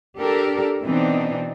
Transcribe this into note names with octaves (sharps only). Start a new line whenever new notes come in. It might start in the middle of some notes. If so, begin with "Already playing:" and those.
D4 G4 A4 A#4
B2 E3 C4 D4 D#4